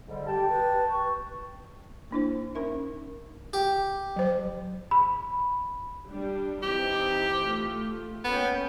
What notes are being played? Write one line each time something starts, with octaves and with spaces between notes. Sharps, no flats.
G#2 D3 G3
G4 G5 A5
B4
C#6
A#3 D4 E4 C5
C#4 D#4 A#4 E5
G4
F#3 C5
B5
G3 D4
E3 C4 D#4 G4
A3 F4
A#3 B3 C#4 G5